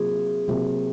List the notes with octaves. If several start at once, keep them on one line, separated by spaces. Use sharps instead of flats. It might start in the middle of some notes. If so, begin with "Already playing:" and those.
Already playing: C3 F#3 A#3 F4 G#4
C3 F#3 A#3 F4